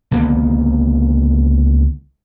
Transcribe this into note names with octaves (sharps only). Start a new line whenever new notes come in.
C#2 D3 A#3 B3